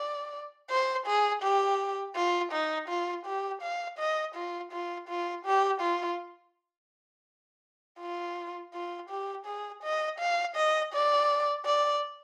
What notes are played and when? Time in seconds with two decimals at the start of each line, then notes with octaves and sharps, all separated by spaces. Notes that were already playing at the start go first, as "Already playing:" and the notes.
Already playing: D5
0.70 C5
1.06 G#4
1.42 G4
2.16 F4
2.52 D#4
2.88 F4
3.26 G4
3.62 F5
3.98 D#5
4.35 F4
4.72 F4
5.08 F4
5.45 G4
5.81 F4
8.00 F4
8.74 F4
9.09 G4
9.46 G#4
9.83 D#5
10.19 F5
10.56 D#5
10.93 D5
11.65 D5